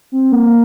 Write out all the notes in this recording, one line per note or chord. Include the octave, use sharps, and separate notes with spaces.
C4
A#3